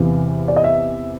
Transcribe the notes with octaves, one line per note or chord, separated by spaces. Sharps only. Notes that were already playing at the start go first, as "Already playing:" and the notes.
Already playing: E2 C3 E3 F5
D5
D#5
E5